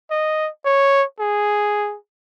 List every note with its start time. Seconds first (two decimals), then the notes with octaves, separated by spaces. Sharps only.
0.11 D#5
0.65 C#5
1.19 G#4